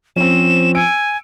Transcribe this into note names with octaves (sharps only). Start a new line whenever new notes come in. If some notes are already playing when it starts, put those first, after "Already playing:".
F3 C4 C#4 E7
G#5 E6 C#7 D7